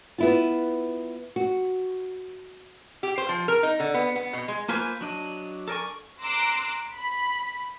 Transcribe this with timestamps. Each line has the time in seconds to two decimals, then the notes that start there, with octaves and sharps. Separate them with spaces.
0.18 B3 E4 F4
1.36 F#4
3.03 G4
3.18 C5
3.29 F3
3.48 A#4
3.63 D#4
3.80 D3
3.94 B3
4.16 B3
4.33 B2
4.48 G#3
4.68 A#3 F4 B4 C5 G#5
5.01 F#3 D4 D#5
5.68 A4 A#4 D5 G#5 C#6
6.22 A#5 C6 D6 E6 F#6
6.95 B5